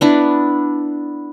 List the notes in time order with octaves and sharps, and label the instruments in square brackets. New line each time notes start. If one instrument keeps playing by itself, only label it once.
[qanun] B3 D4 E4